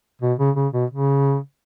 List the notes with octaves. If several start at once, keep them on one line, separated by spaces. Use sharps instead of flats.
B2
C#3
C#3
B2
C#3